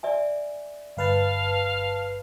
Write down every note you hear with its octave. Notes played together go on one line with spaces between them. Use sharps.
D5 E5 G#5
G1 B4 F5 A5